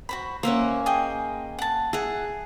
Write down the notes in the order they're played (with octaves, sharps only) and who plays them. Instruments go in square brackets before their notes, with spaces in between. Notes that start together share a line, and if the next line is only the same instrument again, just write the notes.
[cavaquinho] F#4 C5 B5
[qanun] A#3 C#4 [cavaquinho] C5 E5 F#5
[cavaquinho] G#4 D#5 G5
F#5 A5
[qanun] G#4 [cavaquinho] E5 F#5